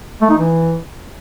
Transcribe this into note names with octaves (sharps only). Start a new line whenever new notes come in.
A3
D#4
E3